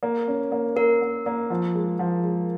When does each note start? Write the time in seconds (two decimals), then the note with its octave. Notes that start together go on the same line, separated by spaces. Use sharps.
0.03 A#3
0.28 C#4
0.52 A#3
0.76 A#3 A#4
1.02 A#3
1.26 A#3
1.50 F3
1.75 G#3
1.99 F3
2.24 G#3